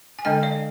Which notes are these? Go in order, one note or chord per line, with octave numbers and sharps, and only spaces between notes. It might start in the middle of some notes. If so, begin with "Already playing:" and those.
G#5
D3 G#3 D4 D#5 G5
D5 F5